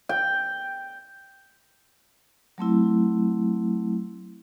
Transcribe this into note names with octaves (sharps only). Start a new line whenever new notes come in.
G5
F#3 A3 C4 E4